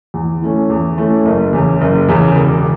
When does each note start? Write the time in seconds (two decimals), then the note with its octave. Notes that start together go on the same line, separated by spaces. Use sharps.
0.14 E2
0.42 E3 A3 C#4
0.70 E2
0.97 E3 A3 C#4
1.25 F#1
1.53 E2 C#3
1.81 F#1
2.09 E2 C#3
2.36 E1